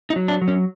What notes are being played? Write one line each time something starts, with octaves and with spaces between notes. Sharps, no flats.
D#4
F#3
D4
F#3
C#4